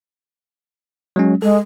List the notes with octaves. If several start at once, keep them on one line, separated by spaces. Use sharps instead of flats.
F#3 G#3 C#4
G#3 A4